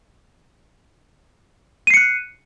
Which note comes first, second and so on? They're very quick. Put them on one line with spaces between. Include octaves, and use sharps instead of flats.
D#7 C7 C#7 F#6